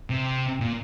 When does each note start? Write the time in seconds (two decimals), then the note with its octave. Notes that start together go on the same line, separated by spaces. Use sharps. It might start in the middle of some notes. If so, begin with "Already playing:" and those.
0.10 C3
0.60 A#2